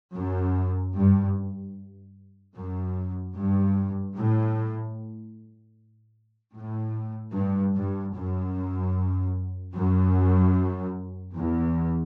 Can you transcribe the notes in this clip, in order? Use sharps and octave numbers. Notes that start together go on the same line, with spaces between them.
F#2
G2
F#2
G2
A2
A2
G2
G2
F#2
F#2
E2